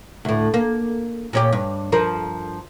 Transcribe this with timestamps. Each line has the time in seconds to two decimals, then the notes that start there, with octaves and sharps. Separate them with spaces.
0.25 D2 A2
0.54 A#3
1.33 A#2 C#4 G4
1.53 G2
1.92 G2 F3 A#4